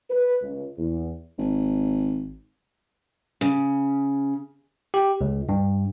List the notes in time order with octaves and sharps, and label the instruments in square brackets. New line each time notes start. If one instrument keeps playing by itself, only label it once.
[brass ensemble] B4
C#2
E2
[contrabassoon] G#1
[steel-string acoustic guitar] C#3
[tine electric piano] G4
C#2
G2